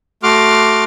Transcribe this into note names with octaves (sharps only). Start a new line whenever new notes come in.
A3 F#4 C6 D6 F6